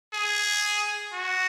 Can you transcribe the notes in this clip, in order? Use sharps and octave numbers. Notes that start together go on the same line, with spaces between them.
G#4
F#4